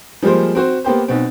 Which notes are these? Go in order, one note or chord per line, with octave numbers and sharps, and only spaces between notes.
F3 G3 G#3 A#3 C5
C4 F#4 C5
A#3 B3 G4 C5
B1 B2 C4